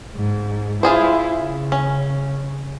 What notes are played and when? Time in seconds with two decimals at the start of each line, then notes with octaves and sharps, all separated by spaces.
0.15 G#2
0.83 E4 F4 G#4 C5
1.41 C#3
1.72 C#4